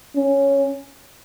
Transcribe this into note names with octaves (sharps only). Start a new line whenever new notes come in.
C#4